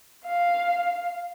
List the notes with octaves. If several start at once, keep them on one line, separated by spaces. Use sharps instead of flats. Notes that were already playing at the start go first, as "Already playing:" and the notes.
F5